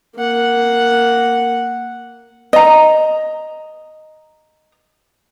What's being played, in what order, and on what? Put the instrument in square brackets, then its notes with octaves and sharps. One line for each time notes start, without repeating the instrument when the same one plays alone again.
[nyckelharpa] A#3 F#5
[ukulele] D#5 A#5